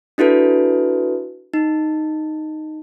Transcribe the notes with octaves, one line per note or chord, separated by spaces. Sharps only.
D4 E4 F#4 A4 B4
D#4